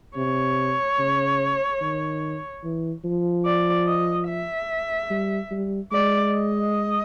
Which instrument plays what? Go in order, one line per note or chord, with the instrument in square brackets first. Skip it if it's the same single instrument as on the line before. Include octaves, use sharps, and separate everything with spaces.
[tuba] C3 [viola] C#5
[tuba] C#3
D#3
E3
F3
[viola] D5
D#5
E5
[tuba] G3
G3
[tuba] G#3 [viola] D5
[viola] D#5